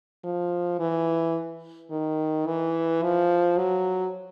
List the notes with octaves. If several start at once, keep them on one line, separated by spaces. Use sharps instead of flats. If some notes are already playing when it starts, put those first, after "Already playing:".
F3
E3
D#3
E3
F3
F#3